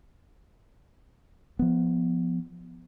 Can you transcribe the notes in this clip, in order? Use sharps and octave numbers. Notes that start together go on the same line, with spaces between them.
F3 B3